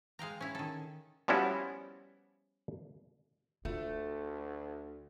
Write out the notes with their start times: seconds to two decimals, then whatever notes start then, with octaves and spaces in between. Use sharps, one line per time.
0.19 G#3 F5 G5 A#5
0.41 C#4 E4
0.55 D#3 A4
1.28 F3 G3 B3 C#4 E4 F#4
3.65 D2 A3 F4